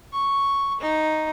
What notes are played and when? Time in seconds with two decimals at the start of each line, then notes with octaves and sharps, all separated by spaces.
0.13 C#6
0.81 D#4